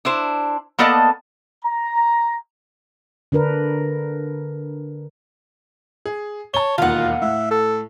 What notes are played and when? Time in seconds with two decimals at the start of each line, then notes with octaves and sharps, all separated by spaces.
0.05 D4 E4 C5
0.79 A#3 B3 A4 D5 D#5 A5
1.64 A#5
3.32 D3 D4 A#4 B4
6.06 G#4
6.54 C#5 A5 G7
6.78 E1 D#2 F4 F5 F#5
7.22 A2 E5
7.51 A4